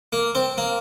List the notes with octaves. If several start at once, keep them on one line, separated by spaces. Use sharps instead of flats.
A#3
C4
A#3